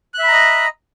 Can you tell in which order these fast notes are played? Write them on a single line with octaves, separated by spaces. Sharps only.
F#6 E5 B5 A#5 D#5